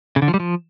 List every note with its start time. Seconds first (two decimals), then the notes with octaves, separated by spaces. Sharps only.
0.16 C#3
0.22 D3
0.28 F3
0.34 G3
0.40 F3